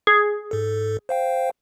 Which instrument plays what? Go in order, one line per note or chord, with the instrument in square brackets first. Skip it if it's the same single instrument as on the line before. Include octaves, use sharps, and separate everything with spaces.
[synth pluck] G#4
[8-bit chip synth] G#2 A4
C5 F5 G5